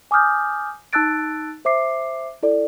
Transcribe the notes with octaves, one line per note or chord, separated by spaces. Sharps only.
G#5 D6 D#6 F6 G6
D#4 A5 E6 F#6 A6 D7
C5 E5 D6 C7
E4 A4 D5